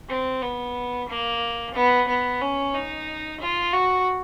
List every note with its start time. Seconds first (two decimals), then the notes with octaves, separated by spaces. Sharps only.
0.09 C4
0.42 B3
1.08 A#3
1.74 B3
2.08 B3
2.41 C#4
2.74 D#4
3.41 F4
3.73 F#4